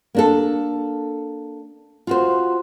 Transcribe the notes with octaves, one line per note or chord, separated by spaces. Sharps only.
A#3 D4 A4
F4 F#4 C5